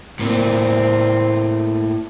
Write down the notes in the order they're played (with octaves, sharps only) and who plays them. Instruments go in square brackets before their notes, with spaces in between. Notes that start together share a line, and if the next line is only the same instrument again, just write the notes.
[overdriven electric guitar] A2 A#3 [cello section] C4